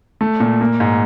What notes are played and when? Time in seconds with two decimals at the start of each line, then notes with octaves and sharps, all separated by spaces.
0.21 A3
0.40 A#2
0.61 A#3
0.80 G#2